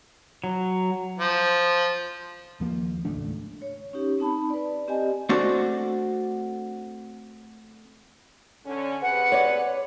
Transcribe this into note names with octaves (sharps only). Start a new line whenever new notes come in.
F#3
F3
D#2 F3 A#3
G#1 C#2 A3 D4
C#5
C#4 D#4 G4
C4 D#4 A5 B5
B4 D5
C4 G4 D5 D#5 G#5
A3 C4 D4 F#4 D5
D3 C#4
C3 G#4 B4 F#5
C#5 D5